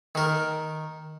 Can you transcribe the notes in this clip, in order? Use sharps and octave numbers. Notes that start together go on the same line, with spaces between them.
D#3 A#4